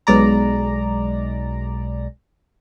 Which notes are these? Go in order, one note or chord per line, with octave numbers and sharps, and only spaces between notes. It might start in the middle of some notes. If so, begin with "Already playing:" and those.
B1 G#3 D5 A#5